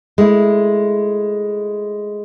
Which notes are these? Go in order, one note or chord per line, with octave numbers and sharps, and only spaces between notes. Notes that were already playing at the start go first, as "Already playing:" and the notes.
G#3 A3 E4